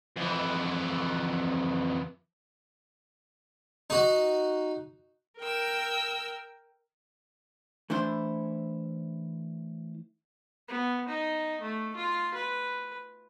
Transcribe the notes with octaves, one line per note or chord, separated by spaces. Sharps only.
F2 E3
D#4 F#4
A#4 G5 E6
E3 A3 D4 E4 C5
B3
D#4
A3
F4
B4